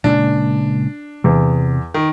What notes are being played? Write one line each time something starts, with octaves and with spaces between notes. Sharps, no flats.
A#2 C#3 G#3 D4
E2 C3
D#3